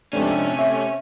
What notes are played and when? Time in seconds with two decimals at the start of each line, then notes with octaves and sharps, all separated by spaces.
0.13 F2 G#2 C3 A3 C#4 D4
0.59 E5